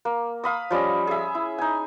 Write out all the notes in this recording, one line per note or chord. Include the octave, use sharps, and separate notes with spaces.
A#3
F5 B5 D#6
F3 G3 C#4 D#5
G#4 E5
E4
D#4 G#5